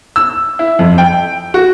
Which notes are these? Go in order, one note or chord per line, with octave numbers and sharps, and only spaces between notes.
E6
E4
F2
G5
F#4